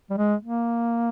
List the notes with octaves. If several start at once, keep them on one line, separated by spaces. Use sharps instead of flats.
G3
G#3
A#3